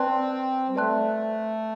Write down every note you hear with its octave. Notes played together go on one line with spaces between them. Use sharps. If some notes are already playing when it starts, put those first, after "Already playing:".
Already playing: C4 B4 D5 A5 C6 F#6
G3
A3 B4 D5 A5 C6 F#6